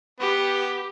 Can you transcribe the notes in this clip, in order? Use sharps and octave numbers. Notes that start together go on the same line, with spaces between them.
B3 G4